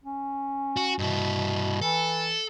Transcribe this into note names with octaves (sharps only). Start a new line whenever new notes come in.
C#4
F#4
G2 B2 E4
E3 A4